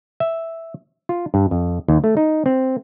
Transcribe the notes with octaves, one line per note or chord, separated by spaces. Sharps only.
E5
F4
G2
F2
D#2
A3
D#4
C4